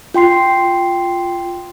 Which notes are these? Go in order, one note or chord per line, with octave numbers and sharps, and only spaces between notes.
F4 G5 C6 C7